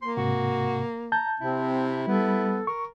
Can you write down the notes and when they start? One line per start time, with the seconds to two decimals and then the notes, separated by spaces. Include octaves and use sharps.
0.02 A#3 C6
0.17 G#2 C3 F#4
1.12 A5 A#5 G6
1.41 C3 C4 E4
2.07 G3 B3 A4
2.67 A#4 C#6